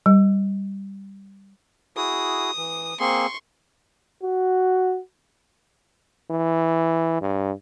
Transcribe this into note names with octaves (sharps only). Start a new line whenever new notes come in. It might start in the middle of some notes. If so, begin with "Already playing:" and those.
G3
E4 F#4 G#4 D#6
E3
A#3 C4 G#4 C6 C#6
F#4
E3
G2